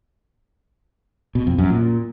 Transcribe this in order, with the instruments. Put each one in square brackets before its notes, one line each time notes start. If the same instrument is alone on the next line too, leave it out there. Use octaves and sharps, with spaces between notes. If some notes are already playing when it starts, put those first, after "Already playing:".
[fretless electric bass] B2
F2
F#2
A#2